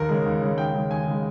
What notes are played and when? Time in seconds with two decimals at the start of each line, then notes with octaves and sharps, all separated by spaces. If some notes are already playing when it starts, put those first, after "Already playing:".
Already playing: D#2 A#4
0.09 C#3 G#3
0.26 D#2
0.42 C#3 G#3
0.58 D#2 G5
0.74 C#3 G#3
0.91 D#2 G#5
1.06 C#3 G#3